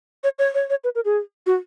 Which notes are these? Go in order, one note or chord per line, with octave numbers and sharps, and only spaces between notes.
C#5
C#5
C#5
C#5
B4
A#4
G#4
F#4